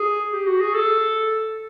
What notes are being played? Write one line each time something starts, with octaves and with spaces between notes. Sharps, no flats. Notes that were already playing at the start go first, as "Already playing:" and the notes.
Already playing: G#4
G4
F#4
G#4
A4